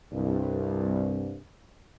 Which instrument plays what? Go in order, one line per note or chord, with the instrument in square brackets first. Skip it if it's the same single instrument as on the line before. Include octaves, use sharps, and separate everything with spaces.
[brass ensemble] C2 G2